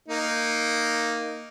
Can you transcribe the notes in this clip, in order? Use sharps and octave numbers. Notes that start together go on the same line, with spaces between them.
A#3 D#4